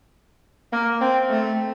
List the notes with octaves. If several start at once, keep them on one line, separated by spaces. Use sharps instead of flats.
A#3
C4
A3